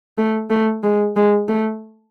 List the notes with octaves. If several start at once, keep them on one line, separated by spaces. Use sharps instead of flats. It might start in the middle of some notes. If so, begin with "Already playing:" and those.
A3
A3
G#3
G#3
A3